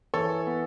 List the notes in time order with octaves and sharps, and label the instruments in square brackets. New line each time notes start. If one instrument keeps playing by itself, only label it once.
[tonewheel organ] E3 [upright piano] A4 C#5
[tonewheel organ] B3